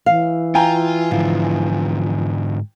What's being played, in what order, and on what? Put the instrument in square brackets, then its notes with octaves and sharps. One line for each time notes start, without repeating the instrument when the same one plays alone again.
[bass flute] E3 [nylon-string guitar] F5
[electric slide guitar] F4 [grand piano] G5 G#5 A#5
[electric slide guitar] G#2 D3 [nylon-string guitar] F3